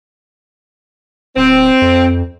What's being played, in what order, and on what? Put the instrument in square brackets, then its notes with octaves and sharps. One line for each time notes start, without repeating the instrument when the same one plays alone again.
[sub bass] D1 [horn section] C4
[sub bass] F2